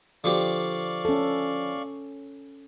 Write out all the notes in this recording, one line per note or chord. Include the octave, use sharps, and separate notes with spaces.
D3 F3 G4 D5 F5 C#6
C#4 A4